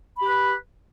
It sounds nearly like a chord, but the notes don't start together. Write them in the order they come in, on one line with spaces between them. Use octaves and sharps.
B5 G4 B4